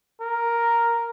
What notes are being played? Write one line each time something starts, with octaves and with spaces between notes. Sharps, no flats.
A#4